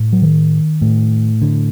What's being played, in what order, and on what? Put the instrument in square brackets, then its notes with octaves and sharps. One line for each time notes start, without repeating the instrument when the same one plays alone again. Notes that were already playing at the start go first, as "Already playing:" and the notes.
Already playing: [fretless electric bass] A2
F#3
D#3
A2
D3